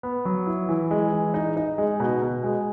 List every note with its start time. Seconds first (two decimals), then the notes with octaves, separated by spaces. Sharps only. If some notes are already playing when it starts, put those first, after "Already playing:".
0.03 B3
0.25 F#3
0.47 E4
0.69 E3
0.91 G#3
1.13 E3
1.34 D#4
1.57 D#4
1.78 G#3
2.00 B2
2.22 B2
2.44 G#3